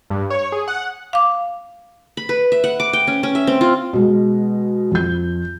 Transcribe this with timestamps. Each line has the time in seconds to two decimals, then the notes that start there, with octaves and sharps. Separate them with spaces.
0.10 G2
0.30 C#5
0.52 G#4
0.68 F#5
1.13 F5 D6
2.17 B5
2.29 B4
2.52 E5
2.64 F#5
2.80 D6
2.93 G5
3.07 C#4
3.23 C#4
3.35 E5
3.47 C4
3.61 F4
3.93 B2 G#3
4.91 F2 G6